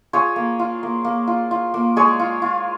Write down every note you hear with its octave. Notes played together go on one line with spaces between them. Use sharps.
F4 G#4 C#5
A#3
F4
A#3
A#3
F4
F4
A#3
G#3 G#4 C#5
F4
F4